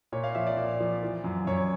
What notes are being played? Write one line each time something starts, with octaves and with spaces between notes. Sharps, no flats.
A#2 C#5
F5
F3 E5
D5
A#2
F3
E3
F#2
F#2 C#5